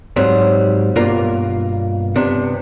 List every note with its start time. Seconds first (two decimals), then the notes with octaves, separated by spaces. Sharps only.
0.16 G#2 F#3 G3 C4
0.96 G2 B2 A#3 F4 A#4 D5
2.16 C3 B3 D4